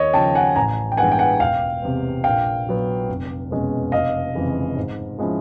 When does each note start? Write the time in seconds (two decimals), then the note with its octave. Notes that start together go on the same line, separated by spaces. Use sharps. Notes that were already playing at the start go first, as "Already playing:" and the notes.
Already playing: D#2 C#5 D#5
0.13 C#3 F3 G5 A5
0.35 F#5 G#5
0.56 A1 G#5 A#5
0.92 G5
0.97 G2 E3 G#3 B3 F#5 G#5
1.12 G5
1.19 F#5 G#5
1.40 E1 F5 G5
1.82 E2 C3
2.24 A#1 F5 G5
2.66 A#2 F#3 B3
3.09 F1
3.51 E2 B2 G#3 C#4
3.92 F1 D#5 F5
4.35 F2 C#3 E3 G#3
4.77 G#2
5.18 F3 G#3 C#4 E4